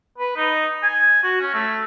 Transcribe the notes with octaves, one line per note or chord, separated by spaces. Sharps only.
B4
D#4
G#5
F#4
C#4
A3